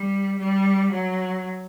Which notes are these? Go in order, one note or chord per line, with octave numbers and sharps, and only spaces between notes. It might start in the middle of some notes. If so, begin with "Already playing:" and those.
Already playing: G3
G3
F#3